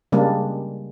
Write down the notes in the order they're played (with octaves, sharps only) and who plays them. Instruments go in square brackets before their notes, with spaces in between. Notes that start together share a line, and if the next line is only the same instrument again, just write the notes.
[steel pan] C#3 G3 G#3 A#3 D4